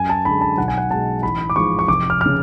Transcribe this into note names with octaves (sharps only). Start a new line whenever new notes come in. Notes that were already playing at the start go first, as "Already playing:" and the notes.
Already playing: F#2 G#5
A5
D3 G#3 B5
A5
B1 F#5
G#5
F#5
B2 G#3 A5
A1 B5
D6
G#2 F3 G#3 C#6
C#6
F1 D6
F6
C#3 F6